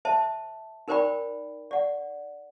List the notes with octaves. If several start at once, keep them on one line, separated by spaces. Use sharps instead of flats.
C5 E5 A5
D#4 A#4 C5 D5 G5 B5
D5 F#5